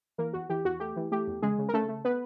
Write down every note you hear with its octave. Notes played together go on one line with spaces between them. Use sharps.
E3 A#3 A#4
E2 F#4
E3 G4
E2 F#4
A3 G4
E3
A3 G4
E2
C#3 G#3 G#4
C#3
A#4
C#3 A3 A4
A3
B3 B4